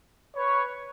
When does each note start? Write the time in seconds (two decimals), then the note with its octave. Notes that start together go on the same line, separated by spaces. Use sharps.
0.36 B4 C#5